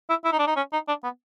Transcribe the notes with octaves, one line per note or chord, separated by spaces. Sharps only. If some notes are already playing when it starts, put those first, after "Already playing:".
E4
E4
D#4
D4
D#4
C#4
D#4
D4
B3